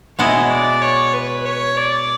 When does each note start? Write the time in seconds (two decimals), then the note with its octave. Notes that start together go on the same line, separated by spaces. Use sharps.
0.18 B2 G#3 B3 E4 C#5
0.50 D5
0.82 C#5
1.13 B4
1.45 C#5
1.77 D5